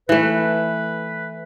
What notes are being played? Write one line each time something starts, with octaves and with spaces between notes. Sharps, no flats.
E3 A3 B4